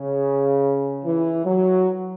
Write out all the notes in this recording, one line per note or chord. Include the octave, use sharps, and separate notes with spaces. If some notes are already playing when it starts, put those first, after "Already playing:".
Already playing: C#3
E3
F#3